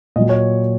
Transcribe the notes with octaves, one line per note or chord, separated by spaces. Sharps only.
A#2 F#3 D#5
C#5